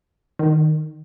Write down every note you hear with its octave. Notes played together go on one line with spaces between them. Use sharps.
D#3